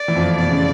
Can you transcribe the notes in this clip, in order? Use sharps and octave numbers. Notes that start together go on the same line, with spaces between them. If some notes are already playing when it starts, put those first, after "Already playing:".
Already playing: D5
E3
F2 F3
B2 D5
C#3